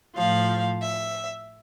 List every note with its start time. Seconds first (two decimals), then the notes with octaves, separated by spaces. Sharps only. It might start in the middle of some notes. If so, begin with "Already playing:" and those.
0.16 A2 F3 F5
0.82 E5